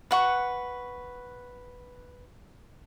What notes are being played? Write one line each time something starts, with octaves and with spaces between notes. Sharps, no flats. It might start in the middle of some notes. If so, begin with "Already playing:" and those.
B4 F#5 C#6